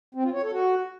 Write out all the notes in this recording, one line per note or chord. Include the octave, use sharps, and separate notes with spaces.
C4
F4
C#5
A4
F#4